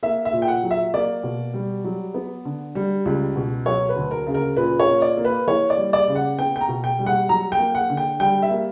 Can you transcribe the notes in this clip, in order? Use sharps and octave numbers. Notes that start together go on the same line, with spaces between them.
A#3 E5
E5
A#2
G5
F#5
F#3
E5
A#3 D5
B2
G3
F#3
B3
D3
G3
C#2
B2
F#3 C#5
B4
D2
A#4
C#3
A#4
A#2 B4
C#5
A#3
D5
A#3
B4
E3 C#5
D5
G3
D5
C#3
F#5
B3 G5
G5
A#5
B2
G5
G3
F#5
F#3 A#5
G5
A#3
F#5
D3
G5
G3 G5
E5
A#3